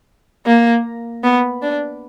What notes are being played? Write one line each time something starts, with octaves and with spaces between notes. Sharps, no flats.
A#3
B3
D4